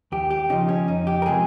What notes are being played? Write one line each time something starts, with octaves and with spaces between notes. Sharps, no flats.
D#2 G4
G4
C#3 F3 D#4
C#4
F2 D#4
G4
A#4
C3 F3 G#3 G#4